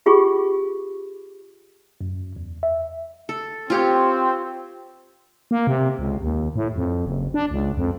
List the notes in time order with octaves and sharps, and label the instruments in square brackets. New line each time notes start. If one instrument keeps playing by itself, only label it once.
[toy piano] C#4 F4 G4 G#4 C#6
[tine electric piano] F#2
E2
E5
[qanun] A4
[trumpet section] C4 [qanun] F4 G4 C#5
[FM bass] A#3
C3
C#2
D#2
A2
F2
F#1
D4
C#2
F2